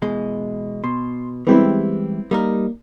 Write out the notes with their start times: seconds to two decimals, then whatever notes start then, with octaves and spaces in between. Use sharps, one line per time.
0.02 B2 E3 G#3
0.84 B2 C6
1.47 E3 G3 G#3 B3 C4 E4 G4
2.31 G3 A#3 D#4 A#4